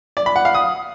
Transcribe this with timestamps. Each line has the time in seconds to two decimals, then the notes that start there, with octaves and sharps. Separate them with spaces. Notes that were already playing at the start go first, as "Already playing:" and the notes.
0.17 D5
0.26 B5
0.36 F#5
0.45 F5
0.55 D#6